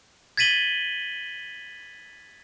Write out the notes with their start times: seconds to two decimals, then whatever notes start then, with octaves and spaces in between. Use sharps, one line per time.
0.37 G#6 A6 B6 D#7 F#7 G7